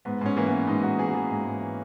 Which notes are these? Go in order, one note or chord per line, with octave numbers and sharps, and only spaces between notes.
G#2 B3
G#2 C#4
E3 A#3
B3
E3
G#2 D#4
G#2 F#4
E3 G#4
F#4
E3 G#4
G#2
G#2
E3